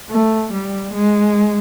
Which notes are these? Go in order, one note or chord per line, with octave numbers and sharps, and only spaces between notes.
A3
G3
G#3